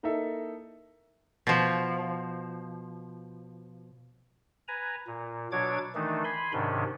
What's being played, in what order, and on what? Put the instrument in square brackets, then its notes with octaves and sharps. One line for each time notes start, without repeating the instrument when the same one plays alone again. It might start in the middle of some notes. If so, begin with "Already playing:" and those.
[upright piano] A#3 D#4 E4 A4 E5
[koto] B2 F3
[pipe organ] B4 G#5 A#5
A#2
B2 F#3 D4 C#5 D6 G#6
D#3 E3 A3 D4 D#4
G#5 B5 C6
G#2 C3 D#3 C#4 D4